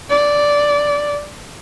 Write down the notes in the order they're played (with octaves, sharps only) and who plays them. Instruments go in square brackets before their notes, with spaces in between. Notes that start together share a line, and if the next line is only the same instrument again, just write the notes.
[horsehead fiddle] D5